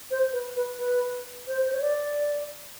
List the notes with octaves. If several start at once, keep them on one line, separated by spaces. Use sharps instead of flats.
C5
B4
B4
B4
C5
C5
C#5
D5